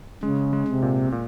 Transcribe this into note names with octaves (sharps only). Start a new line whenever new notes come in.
C#3 G#3
G#3
C3
A#2
A#2